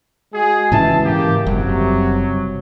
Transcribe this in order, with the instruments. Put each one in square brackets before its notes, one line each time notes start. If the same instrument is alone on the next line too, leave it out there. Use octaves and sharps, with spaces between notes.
[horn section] G#3 F#4 G#4
[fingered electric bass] G#2 C#3 E3 [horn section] B4 E5 A5
[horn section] A#3 G4
[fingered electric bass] F#1 G3 [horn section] C3 F#3